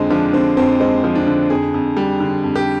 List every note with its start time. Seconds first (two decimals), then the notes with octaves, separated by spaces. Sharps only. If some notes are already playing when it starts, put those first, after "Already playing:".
Already playing: F2 D3 F3 G#3 C4
0.10 F3 D4
0.33 D3 C4
0.57 F2 C4
0.80 G#3 C4
1.04 F3
1.15 D4
1.27 D3
1.50 F2 G#4
1.74 F2
1.97 G3
2.20 D3
2.44 F2
2.56 G4